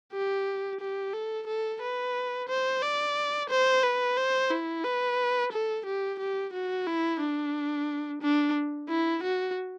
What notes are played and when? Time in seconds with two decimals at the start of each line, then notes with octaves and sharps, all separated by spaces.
0.12 G4
0.80 G4
1.13 A4
1.47 A4
1.81 B4
2.49 C5
2.82 D5
3.49 C5
3.83 B4
4.17 C5
4.51 E4
4.84 B4
5.52 A4
5.86 G4
6.19 G4
6.53 F#4
6.87 E4
7.20 D4
8.21 D4
8.88 E4
9.23 F#4